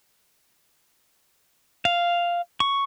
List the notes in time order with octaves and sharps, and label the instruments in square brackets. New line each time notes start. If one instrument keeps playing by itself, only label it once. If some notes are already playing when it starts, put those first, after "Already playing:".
[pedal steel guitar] F5
C#6